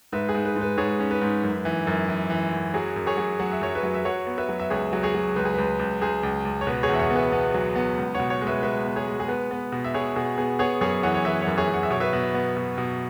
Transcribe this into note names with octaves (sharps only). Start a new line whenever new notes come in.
G#2 B4 E5
G#4
G#2
B4
G#2
B4
G#2 G#4 C#5
C#4
B4
G#2
F#2
E3
F#2
E3
E3
F#2
F#3 G#4
F#2
G#4 C#5
F#3
F#3 F#5
E5
F#2 C#5
B4 E5
F#3
E5
F#3 C#5 F#5
B3
B4 E5
F#3
E5
C#2 G#4 C#5
F#3
G#4 C#5
F#3
C#2 B4
G#4
C#2 B4
C#2
C#2 G#4
C#2
C#2
C#5
B2 B4
G#4 C#5
E2 E5
C#5 F#5
B3
B4 E5
B3
F#3
B3
C#2
B2 C#5 F#5
C#5 F#5
G#3
B4 E5
G#3 B4 E5
B3
G#4 C#5
G#3
G#4
B3 B4
B3
B2
E5
B2 G#4 C#5
B2 G#4
B3 G#4
B3 G#4 C#5
F#2 G#4 C#5
E3 C#5 F#5
C#5
E3 B4 E5
C#5 F#5
F#2
G#4 C#5
F#2 F#5
E5
B2 C#5
B4 E5
B2
B3
B2
B2